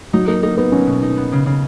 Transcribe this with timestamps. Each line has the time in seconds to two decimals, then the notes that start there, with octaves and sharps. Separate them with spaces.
0.13 F#3 D#4
0.28 A#3 D#4
0.43 A#3 D#4
0.57 B3 D#4
0.72 F#3 C#4
0.87 B2
1.02 D#4
1.17 B3
1.32 C#3
1.46 C#3